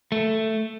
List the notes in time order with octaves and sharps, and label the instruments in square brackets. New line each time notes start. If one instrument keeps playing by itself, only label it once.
[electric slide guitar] A3